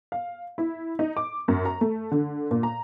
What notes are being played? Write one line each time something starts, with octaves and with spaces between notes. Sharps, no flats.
F5
E4
D#4
D6
F#2
A#5
A3
D3
A#2
A#5